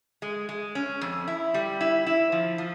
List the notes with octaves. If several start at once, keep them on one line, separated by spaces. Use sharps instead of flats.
G#3
G#3
C#4
F2
E4
G3
E4
E4
F3
F3